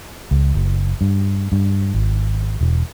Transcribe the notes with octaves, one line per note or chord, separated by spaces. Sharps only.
C#2
F#1
G2
G2
G#1
E1